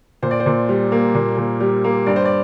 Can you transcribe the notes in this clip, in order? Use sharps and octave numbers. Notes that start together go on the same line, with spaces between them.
A#2 C5
D5
C5
A#2
G3
A#3
A#2
A#2
G3
A#3
G2 D5
C5
D5